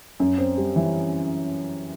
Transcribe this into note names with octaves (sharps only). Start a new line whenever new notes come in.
F#2
C4
G3
E3